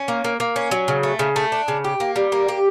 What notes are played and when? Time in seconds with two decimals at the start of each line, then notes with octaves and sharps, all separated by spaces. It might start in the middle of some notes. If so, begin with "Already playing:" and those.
Already playing: C#4
0.08 A#3
0.24 A#3
0.40 A#3
0.56 C#4
0.71 F#3
0.88 C#3
1.03 A3
1.19 C#3
1.36 A3
1.52 D4
1.68 C#3
1.84 G4
2.00 A#3
2.16 G3
2.32 A#3
2.48 G4